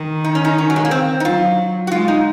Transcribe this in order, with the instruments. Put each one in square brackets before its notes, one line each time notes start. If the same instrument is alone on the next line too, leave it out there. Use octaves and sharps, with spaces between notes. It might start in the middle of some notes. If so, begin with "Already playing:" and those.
Already playing: [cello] D#3
[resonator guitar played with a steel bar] D#4
C#4
D#4
C#4
F#3
G#3
A#3
C4
D#4
[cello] F#3 [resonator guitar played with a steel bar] F4
[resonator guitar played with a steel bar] F#4
[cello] G#3 [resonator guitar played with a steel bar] F4
[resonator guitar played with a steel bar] D#4